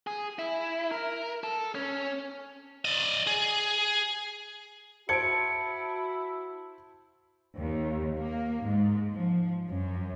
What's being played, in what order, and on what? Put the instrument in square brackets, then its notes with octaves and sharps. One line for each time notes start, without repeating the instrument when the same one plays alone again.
[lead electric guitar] G#4
E4
A#4
A4
C#4
[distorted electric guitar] D5 D#5
G#4
[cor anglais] E4 [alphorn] F#4 [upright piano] C5 A5 G#6 [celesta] C#7 D7
[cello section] D#2
A#3
G#2
F3
F#2